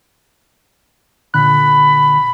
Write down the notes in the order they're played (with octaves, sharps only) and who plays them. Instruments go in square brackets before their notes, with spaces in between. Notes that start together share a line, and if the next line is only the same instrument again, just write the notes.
[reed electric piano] A#2 D3 F#6 [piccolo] B5